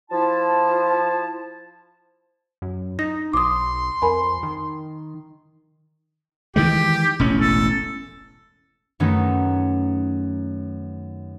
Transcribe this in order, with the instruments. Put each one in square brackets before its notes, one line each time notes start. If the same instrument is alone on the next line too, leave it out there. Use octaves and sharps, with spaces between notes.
[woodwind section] F3 E4 A5
[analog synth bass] F#2
[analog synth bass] D#4 [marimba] A#6
[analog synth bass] B1 [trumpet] C6 [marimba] D6 D#6
[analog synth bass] F2 [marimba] A#4 G#5 B5
[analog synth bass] D#3
[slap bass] D#3 E3 G#3 [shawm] G4
[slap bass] E1 A1 C#4
[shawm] A4
[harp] F#2 D#3 A3 B3 C#4 D#4